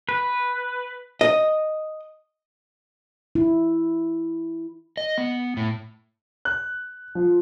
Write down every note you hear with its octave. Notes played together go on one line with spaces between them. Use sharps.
B4
D#5
E4
D#5
B3
A2
F#6
F3